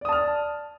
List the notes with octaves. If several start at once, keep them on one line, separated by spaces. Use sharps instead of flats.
D5 A5 D#6 F6